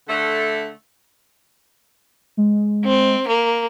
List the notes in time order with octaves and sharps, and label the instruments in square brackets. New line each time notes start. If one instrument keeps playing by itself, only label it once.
[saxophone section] D3 A3
[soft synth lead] G#3
[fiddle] C4
A#3